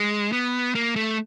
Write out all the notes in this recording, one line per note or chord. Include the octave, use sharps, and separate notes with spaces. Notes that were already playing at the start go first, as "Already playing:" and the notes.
Already playing: G#3
B3
A#3
A3